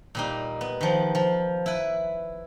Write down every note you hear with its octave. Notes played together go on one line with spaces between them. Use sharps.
A#2 G3 D#4
B3
D#3 F3
F3
E4 B4